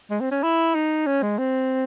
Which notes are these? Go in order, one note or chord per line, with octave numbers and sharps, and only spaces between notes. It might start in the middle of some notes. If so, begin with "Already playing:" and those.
G#3
C4
C#4
E4
D#4
C#4
G#3
C4